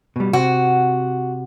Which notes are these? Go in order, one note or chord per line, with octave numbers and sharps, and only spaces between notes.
B2 G3
C3 F#4